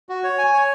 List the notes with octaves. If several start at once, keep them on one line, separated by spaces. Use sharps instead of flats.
F#4
C#5
G#5
C#5